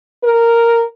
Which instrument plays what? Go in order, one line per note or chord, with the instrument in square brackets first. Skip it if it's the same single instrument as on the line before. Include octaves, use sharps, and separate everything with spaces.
[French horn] A#4